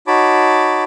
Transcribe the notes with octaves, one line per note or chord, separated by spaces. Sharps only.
D#4 F#4 C#5 A5 B5 D6